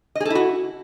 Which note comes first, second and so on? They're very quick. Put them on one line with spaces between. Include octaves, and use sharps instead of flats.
D#5 G#4 A4 E4 F#4